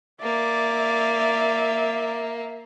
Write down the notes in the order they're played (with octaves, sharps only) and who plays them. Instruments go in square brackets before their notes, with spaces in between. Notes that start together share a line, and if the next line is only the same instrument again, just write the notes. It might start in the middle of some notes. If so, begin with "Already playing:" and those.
[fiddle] A#3 [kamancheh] D5 [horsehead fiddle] E5